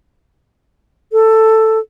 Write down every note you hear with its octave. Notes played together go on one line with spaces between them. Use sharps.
A4